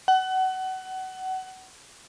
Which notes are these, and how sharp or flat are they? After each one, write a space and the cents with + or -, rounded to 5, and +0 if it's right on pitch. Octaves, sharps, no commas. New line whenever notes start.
F#5 +25